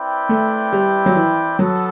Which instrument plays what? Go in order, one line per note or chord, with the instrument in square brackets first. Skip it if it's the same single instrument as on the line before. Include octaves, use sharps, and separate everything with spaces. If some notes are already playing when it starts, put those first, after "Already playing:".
Already playing: [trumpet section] C4 E4 B4 D5 G5
[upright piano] A3
G3
F#3
E3
[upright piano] F#3 [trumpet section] B3 F#4 A4